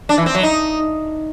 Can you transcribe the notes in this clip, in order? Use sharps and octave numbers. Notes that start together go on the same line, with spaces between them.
D4
E3
C4
F#3
D#4